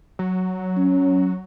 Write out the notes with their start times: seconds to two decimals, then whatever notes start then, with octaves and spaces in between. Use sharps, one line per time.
0.19 F#3
0.77 C#4